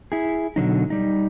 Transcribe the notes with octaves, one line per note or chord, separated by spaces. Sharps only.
E4 G#4
B2 D3 F#3 D#4
G3 D#4